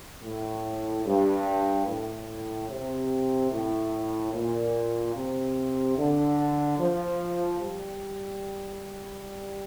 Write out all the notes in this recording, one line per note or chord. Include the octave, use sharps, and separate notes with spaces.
A2
G2
A2
C3
A2
A#2
C3
D3
F3
G3